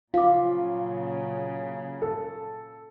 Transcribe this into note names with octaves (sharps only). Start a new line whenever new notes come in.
A#2 C#3 F#3 F4 F5 D6
A4